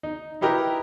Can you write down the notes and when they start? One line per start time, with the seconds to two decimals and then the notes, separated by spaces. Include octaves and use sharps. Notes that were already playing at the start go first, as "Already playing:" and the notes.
0.03 D#4
0.41 D#4 E4 G4 A#4 B4 D#5